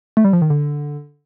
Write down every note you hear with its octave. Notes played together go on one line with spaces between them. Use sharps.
A3
G3
F3
D#3
D3